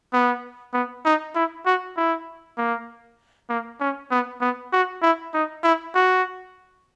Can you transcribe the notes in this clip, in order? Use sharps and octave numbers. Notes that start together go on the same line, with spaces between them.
B3
B3
D#4
E4
F#4
E4
A#3
A#3
C#4
B3
B3
F#4
E4
D#4
E4
F#4